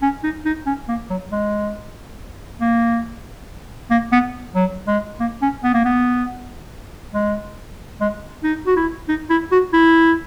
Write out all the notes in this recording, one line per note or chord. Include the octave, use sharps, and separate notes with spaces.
C#4
D#4
D#4
C#4
A#3
F#3
G#3
A#3
A#3
B3
F#3
G#3
A#3
C#4
B3
A#3
B3
G#3
G#3
D#4
F#4
E4
D#4
E4
F#4
E4